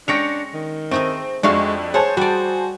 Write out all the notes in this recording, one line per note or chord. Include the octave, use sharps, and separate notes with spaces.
G#3 C#4 D4 G5 A#6 C#7 F7
D#3
A3 C4 D#4 G#4
F2 G#3 A3 D4 F#4 F5
G#4 C5 C#5 F#5 A5
G3 F#4 D5